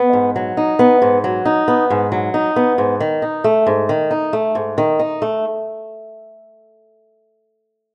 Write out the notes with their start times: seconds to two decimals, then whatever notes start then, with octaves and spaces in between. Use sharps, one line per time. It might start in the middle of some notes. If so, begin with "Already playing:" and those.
Already playing: B3
0.13 G#2
0.36 F#3
0.57 D#4
0.79 B3
1.02 G#2
1.24 F#3
1.45 D#4
1.68 B3
1.90 G#2
2.12 F#3
2.34 D#4
2.56 B3
2.78 G#2
3.00 D#3
3.22 D#4
3.44 A3
3.67 G#2
3.89 D#3
4.11 D#4
4.33 A3
4.55 G#2
4.78 D#3
4.99 D#4
5.22 A3